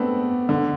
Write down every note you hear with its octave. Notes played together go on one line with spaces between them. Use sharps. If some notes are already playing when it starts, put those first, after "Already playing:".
Already playing: A3 B3 C4 D4
D3